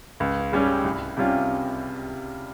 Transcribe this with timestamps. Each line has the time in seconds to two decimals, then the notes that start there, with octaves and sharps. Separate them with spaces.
0.20 C#2
0.52 C#3 G3 C#4 G4
0.84 C2
1.17 C3 G3 C#4 F4